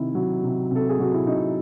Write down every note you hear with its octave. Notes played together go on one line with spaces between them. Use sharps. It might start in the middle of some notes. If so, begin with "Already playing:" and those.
Already playing: C3 D#3 E4
F#3
C3
C3 A4
G#4
F#3 F#4
E4
C3 D#4